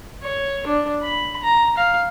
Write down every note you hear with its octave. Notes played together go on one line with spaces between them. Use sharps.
C#5
D4
B5
A#5
F5